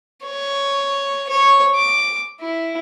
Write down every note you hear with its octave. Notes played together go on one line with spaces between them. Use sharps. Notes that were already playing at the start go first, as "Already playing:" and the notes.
C#5
C#5
D6
E4